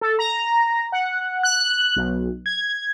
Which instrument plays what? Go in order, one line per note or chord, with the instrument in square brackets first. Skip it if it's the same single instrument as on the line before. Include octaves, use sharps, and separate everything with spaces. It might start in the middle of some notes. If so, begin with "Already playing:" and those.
[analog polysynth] A4
A#5
F#5
F#6
B1
G#6